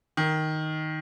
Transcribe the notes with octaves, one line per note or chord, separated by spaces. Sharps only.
D#3